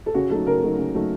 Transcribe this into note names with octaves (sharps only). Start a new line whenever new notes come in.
A4
C#3 F#4
F#3 A3 D#4 A4
C#3 A#4
F#3 A3 D#4
C#3
F#3 A3 D#4